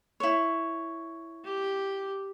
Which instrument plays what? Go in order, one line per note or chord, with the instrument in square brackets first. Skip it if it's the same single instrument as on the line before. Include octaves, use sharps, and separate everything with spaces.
[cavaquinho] E4 C#5
[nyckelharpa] G4